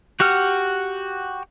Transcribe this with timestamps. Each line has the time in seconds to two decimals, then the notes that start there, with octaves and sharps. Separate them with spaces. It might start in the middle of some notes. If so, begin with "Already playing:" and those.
0.20 F#4 G4 F#5 F6